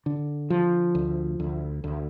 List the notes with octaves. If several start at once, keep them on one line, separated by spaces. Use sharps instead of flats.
D3
F3
D2
D2
D2